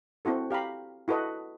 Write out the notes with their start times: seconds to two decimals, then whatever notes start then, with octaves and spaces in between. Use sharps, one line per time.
0.25 C4 E4 F#4 A4
0.51 G4 F5 A#5 B5
1.08 E4 F#4 A4 B4 D#5